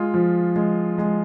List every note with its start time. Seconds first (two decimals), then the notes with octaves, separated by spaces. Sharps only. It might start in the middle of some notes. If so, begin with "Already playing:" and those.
Already playing: G#3 F4
0.14 F3
0.56 G#3
0.98 G#3